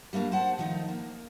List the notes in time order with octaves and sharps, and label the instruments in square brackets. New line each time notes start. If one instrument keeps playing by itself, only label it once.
[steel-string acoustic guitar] G3 A3 A#3 D4
C5 F#5 A5
D#3 F3 A3 D#4
A#3